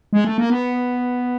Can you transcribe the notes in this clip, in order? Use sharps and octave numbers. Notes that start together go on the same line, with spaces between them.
G#3
A3
A#3
B3